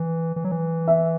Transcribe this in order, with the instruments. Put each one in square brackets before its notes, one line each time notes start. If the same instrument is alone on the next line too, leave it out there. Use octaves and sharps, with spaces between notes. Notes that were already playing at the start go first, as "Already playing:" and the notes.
Already playing: [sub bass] E3
E3
F#3
E3
[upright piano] E5